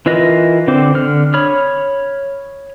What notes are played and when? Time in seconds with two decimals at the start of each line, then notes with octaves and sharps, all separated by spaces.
0.06 E3 F4 A#4 B4 D#5
0.68 D3 C4 C5 D6
0.95 D3 F6
1.34 C#5 B5 D#6 F6